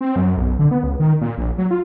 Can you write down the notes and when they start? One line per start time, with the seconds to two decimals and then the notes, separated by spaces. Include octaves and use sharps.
0.01 C4
0.16 F#2
0.37 B1
0.59 D3
0.71 B3
0.84 C#2
1.00 D#3
1.21 A#2
1.37 A#1
1.58 F#3
1.71 F4